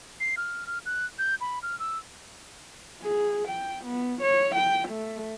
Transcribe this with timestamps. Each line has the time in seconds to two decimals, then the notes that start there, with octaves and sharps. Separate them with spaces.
0.20 C7
0.37 F6
0.67 F6
0.86 F#6
1.19 G6
1.41 B5
1.63 F6
1.79 E6
3.03 G#4
3.48 G5
3.84 B3
4.22 C#5
4.55 G5
4.88 A3